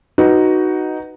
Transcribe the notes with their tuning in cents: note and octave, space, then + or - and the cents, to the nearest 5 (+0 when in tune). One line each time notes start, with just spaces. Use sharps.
D#4 +0 F#4 +10 B4 +0